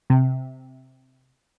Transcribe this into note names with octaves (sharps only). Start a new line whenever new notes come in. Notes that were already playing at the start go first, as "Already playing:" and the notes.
C3